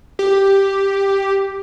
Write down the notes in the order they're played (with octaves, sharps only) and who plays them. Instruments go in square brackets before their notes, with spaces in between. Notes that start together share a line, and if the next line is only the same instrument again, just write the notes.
[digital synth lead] G4